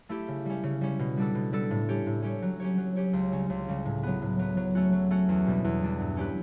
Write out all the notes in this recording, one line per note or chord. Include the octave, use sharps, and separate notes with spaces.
A3 E4 G4
C#3
G3 C#4
C#3
G3 C#4
B2
G3 D4 A4
B2
G3 D4 A4
A2
G3 C#4 G4 C#5
A2
G3 C#4 G4 C#5
F#3
C#4 G4 C#5
F#3
C#4 G4 C#5
C#2
C#3 G3 C#4
C#2
C#3 G3 C#4
A2
F#3 B3
A2
F#3 B3
F#3
A3 C#4 F#4
F#3
A3 C#4 F#4
E2
B2 G3 D4
E2
B2 G3 D4
G2
F#3 C#4 G4 B4